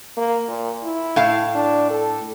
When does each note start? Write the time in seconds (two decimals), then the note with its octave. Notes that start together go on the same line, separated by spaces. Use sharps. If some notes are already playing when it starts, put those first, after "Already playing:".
0.17 A#3
0.48 A#2
0.84 E4
1.16 A2 F5 A5
1.55 D4
1.90 A4